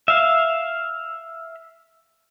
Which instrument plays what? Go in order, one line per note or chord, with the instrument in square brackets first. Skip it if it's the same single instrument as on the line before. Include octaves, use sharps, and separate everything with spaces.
[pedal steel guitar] E5 F5